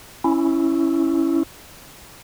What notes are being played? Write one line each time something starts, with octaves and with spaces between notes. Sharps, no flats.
C#4 E4